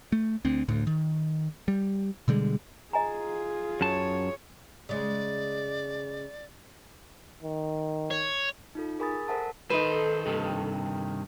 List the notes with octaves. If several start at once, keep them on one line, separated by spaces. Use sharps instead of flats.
A3
D2 C4
D2 A2
D#3
G3
B2 D3 G3 G#3
F4 G#4 D#5 G#5 A#5
F#2 C#5 A5
C#3 G#3 D5
D#3
C#5
D#4 F4 A4
G#4 A#4 G#5 B5 D#6 A6
A4 A#4 C5 E5 F#5 A5
D#3 D#4 A4 B4 C5
G2 C3 D#3